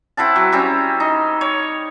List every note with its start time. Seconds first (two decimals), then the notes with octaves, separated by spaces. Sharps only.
0.17 C4 E4 F#5 A5
0.36 F#3
0.52 G3 C4 C#4
1.00 D#4
1.41 C#5